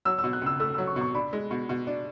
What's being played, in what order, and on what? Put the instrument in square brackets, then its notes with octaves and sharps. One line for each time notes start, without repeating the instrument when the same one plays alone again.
[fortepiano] F#3 [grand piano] E6
[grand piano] E6
[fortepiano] B2
[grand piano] F#6
[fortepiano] C#2 [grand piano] E6
[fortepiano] A3 [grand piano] E6
[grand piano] E6
[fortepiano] F#3
[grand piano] C#6
[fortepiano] B2
[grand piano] C#6
[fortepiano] D4 [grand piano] B5
[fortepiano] G#3
B2
B2
D4